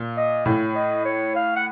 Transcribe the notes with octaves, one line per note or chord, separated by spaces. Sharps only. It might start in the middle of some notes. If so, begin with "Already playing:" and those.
Already playing: A#2
D#5
A2 C#5
D#5
C#5
F5
F#5